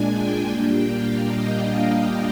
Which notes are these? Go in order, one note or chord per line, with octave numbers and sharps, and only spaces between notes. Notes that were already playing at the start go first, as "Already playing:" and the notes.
Already playing: A#2 G#3 D4 G#5
G5
A#2 G3 A#3 D4
F5
D#5
F5